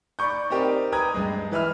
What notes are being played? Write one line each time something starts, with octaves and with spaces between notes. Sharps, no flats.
D5 B5 C#6 G6
C4 D#4 G4 A#4 D5
B4 G5 A#5 D#6 G#6
G2 G#3
E3 B4 E5 F6